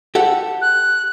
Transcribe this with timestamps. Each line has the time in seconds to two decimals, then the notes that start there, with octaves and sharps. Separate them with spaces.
0.15 G4 A4 F#5
0.61 F#6